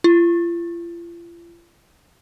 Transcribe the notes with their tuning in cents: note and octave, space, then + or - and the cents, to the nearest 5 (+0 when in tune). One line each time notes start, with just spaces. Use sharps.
F4 -40